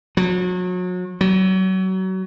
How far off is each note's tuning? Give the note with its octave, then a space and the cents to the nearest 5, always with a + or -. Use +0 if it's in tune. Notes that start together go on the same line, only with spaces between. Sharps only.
F#3 -35
F#3 +30